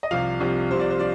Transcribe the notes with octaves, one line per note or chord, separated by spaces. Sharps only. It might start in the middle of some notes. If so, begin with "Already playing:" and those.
D#5
C2 C3 F3 F5
C2 C3 F3
C2 C3 F3 C5
D5
C5
F3 D5